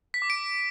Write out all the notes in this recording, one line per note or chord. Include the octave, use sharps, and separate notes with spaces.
B6
D6
D7